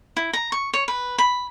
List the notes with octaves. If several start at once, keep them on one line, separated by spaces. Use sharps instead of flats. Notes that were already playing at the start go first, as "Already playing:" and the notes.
E4
A#5
C#6
C#5
B4
B5